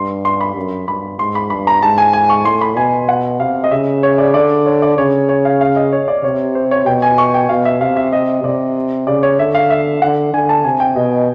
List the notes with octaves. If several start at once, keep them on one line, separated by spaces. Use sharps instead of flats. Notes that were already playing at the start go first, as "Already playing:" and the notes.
Already playing: G2 C6
C6
B5
F#2
G2 B5
G#2 C6
B5
G2 B5
A#5
G#2 A5
G#5
G#5
C#6
A2 C6
B5
B2 G#5
F#5
C3 F5
D#5
C#3 E5
C#5
D5
D3 D5
C#5
D5
C#3 C#5
C#5
F5
F5
D#5
C#5
D5
C3 C#5
C5
C#5
B2 G5
G#5
C#6
G5
B2 F5
E5
C3 F5
E5
D#5
C3 D5
C#3 D5
C#5
D3 E5
F5
E5
D3 F#5
D3 G#5
A5
C3 G#5
G5
B2 D#5